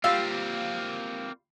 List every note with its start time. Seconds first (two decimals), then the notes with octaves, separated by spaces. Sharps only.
0.04 G3 A#3 C4 F4 G4 F5 E6